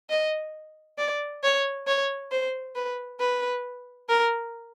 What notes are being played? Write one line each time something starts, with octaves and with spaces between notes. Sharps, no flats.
D#5
D5
C#5
C#5
C5
B4
B4
A#4